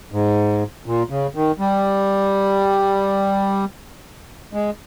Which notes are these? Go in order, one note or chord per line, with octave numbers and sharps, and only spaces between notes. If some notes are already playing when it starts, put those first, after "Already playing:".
G#2
A#2
C#3
D#3
G3
G#3